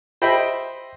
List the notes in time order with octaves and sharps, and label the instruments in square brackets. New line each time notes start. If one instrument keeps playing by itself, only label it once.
[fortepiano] C5 D#5 E5 G5 B5